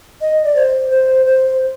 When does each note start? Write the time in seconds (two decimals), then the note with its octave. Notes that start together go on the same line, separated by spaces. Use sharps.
0.21 D#5
0.45 D5
0.56 C5
0.91 C5
1.26 C5